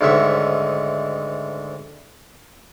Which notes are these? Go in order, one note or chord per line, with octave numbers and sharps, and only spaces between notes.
D2 G#2 D#3 C#4 E5 C#6